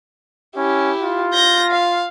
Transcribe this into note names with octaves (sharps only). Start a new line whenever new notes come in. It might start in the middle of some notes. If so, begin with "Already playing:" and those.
C#4 E4 G4
F4
G6 A#6
F5